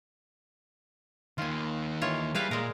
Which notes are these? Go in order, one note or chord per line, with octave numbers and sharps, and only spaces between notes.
D#3 A#3 F4 G#5
E3 F4 C#5
G3 G#4 B4 F5
A#2 G#3 A#4